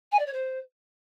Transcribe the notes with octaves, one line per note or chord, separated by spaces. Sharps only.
G#5
D5
C#5
C5